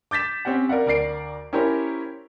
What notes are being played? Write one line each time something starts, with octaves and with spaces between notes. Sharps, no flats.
D6 G6 A6 B6 E7
C4 C#4 G4 F#5
A#4 D5 F5 F#5
D2 A#4 D5 C7 D7
C#4 E4 G4 A#4 C5 C#5